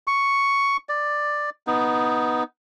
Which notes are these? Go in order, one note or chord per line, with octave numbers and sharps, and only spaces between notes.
C#6
D5
B3 D#4